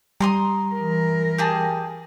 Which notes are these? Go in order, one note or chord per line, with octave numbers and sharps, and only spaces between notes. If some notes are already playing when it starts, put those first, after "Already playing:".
G3 A#5 C6 D#6
E3 A#4
G4 G#4 A5